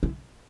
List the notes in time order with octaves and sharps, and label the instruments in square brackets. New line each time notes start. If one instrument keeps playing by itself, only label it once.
[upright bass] E4